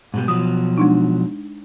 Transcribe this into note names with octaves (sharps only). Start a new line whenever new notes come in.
G#2 B2 G3
B2 F3 F#3 D#6
G#3 D4 D#4